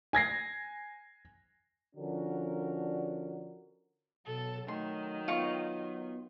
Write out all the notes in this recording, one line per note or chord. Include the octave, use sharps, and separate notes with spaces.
G#5 G#6 A#6 C7
D3 F3 C#4 D4 F#4 A#4
B2 F#3 A4
D#3 A3 C6
B3 F4 C#6